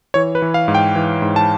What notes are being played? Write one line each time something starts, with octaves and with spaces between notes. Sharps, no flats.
E3 C#5
B4
E3
F5
G#2
G5
E3
G#2
A5